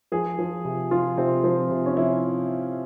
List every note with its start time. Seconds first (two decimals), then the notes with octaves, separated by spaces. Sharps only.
0.12 F3 G#4
0.39 F3
0.65 C3
0.91 F3 F4
1.17 C3 C4
1.44 F3 C4
1.71 C3
1.86 C#4
1.97 F3 E4